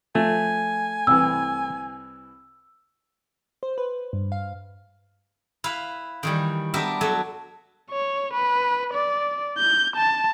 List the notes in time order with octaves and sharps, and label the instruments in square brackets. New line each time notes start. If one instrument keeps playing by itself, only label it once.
[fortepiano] F3 [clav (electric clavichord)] A3 [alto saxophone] G#5
[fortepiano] C2 E3 [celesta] E6
[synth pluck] C5
B4
G2
F5
[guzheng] E4 B4 F5
D#3 E3 G3
B3 D4 G4 A#4 E5
F#3 A3 A4 E5
[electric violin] C#5
B4
D5
G6
A5